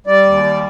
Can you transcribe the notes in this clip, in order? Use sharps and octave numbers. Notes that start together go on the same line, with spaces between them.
G3 D5
D#2
G3